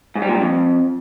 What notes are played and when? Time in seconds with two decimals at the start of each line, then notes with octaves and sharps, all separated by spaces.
0.15 G#2
0.22 G3
0.28 A#2
0.35 G2
0.41 F2